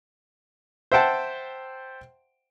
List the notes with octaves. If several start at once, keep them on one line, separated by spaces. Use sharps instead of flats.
C5 E5 F#5 G5 A5